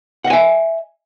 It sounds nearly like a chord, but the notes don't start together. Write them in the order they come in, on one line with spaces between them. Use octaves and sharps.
F#5 D#5 G#5 E5